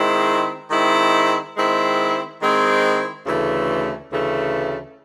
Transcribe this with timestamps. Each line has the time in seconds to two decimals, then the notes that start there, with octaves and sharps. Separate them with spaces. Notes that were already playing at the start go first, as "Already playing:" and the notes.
Already playing: D#3 G#3 C4 E4
0.71 D#3 G#3 C4 E4
1.56 D#3 G#3 C4 E4
2.40 D#3 G#3 C4 E4
3.26 D2 C#3 E3 A3
4.11 D2 C#3 E3 A3